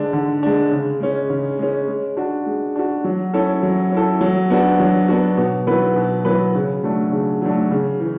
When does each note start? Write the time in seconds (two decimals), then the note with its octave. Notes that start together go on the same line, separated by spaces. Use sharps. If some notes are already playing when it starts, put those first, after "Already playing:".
Already playing: D3 G#3 D4
0.13 D3
0.43 G#3 D4
0.72 C#3
1.00 G#3 C#4
1.30 C#3
1.59 G#3 C#4
1.88 G#3
2.17 D4 F#4
2.47 G#3
2.76 D4 F#4
3.04 F#3
3.34 C#4 E4 A4
3.63 F#3
3.92 C#4 E4 A4
4.21 F#3
4.50 B3 D4 F#4
4.80 F#3
5.08 B3 D4 F#4
5.38 B2
5.67 F#3 B3 E4 B4
5.96 B2
6.25 F#3 B3 E4 B4
6.55 C#3
6.83 F#3 A3 D4
7.12 C#3
7.42 F#3 A3 D4
7.71 C#3
8.00 E3